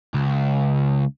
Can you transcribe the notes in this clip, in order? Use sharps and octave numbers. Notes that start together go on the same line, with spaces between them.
C#2